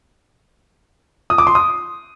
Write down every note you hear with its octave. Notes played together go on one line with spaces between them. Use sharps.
D#6
D6
C6
D#6